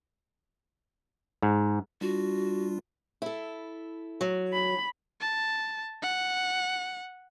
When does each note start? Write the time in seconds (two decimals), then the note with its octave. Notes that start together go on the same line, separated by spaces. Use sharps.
1.43 G#2
2.01 G3 D4 F4 F#4
3.22 E4 A4
4.21 F#3
4.53 B5
5.21 A5
6.02 F#5